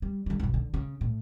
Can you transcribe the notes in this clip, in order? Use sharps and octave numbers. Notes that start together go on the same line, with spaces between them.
G3
D3 G3
B1 G2
D3
C#3
A2